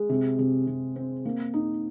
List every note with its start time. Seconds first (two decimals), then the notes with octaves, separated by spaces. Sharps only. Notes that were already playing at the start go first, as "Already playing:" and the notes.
Already playing: G#3
0.09 C3
0.39 C3
0.67 C3
0.96 C4
1.25 A#3
1.54 D#4